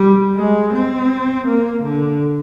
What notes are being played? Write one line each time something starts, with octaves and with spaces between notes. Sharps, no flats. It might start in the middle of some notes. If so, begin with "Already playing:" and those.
Already playing: G3
G#3
C4
A#3
D3